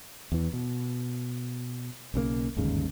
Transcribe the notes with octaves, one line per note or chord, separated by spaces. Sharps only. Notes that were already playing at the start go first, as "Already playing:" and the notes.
E2 E3
B2
B1 C#3 E3 A#3
G1 D#2 G#2 C#3